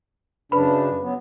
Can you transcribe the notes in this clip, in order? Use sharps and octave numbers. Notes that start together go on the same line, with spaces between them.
F#2 C#3 D4 B4 B5
F#3 B3